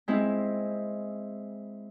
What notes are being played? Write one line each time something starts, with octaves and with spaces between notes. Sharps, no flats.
G#3 C4 E4